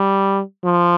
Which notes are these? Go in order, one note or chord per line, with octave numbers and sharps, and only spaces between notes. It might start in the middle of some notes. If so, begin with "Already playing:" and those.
Already playing: G3
F3